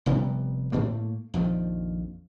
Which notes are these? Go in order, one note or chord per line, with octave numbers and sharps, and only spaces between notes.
F1 C3 G3 B3
A2 A3 A#3
A#1 F2 D#3 F3